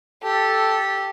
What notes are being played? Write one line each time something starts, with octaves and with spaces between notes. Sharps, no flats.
G4 A4